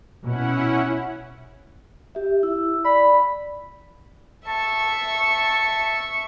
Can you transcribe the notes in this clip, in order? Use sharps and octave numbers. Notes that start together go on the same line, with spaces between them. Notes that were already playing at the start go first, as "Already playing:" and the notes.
B2 C#4 E4 F#5
G4 E5
E4 E6
D5 B5
E5 A5 C#6